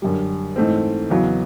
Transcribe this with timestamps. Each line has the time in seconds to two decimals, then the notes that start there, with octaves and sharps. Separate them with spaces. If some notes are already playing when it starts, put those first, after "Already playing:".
0.02 F#2 D3 G3
0.56 G#2 E3 A3 C4
1.10 E2 C#3 F#3 B3